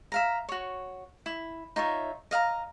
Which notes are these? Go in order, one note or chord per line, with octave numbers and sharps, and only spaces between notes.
E5 F5 A#5
F#4 C#5
E4
D#4 F4 C#5 E5
D#5 F5 F#5 A#5